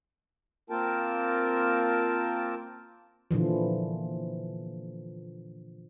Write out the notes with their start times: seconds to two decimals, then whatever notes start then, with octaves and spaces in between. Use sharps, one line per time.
0.70 A#3 C4 F4 A#4 G5 A5
3.31 A#2 D3 E3 F3